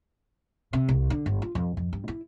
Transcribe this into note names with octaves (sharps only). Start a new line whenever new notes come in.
C3
C2
D3
G1
F4
F2
F2
G2
E4